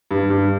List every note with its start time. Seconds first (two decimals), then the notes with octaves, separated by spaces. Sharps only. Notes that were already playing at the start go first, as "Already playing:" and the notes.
0.11 G2
0.30 G2